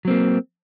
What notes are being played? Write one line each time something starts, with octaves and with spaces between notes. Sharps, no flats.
F#3 A#3 C4